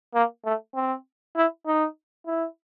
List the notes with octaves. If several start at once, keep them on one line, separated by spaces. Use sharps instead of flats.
A#3
A3
C4
E4
D#4
E4